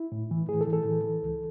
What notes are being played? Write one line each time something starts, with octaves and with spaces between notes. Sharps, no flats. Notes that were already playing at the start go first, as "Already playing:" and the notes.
Already playing: E4
A2
E3
A2 G#4
A4
E3
A4
E3
E3
C#2